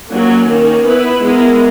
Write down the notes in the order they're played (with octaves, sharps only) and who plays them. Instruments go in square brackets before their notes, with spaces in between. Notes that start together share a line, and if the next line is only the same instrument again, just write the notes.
[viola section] F#3 A#3 C#4
D#3 A#3 C#4
B3 E4 B4
G#3 B3 E4 A#4